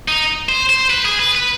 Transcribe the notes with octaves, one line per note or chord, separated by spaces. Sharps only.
D#4
C5
C5
B4
G#4
B4
B4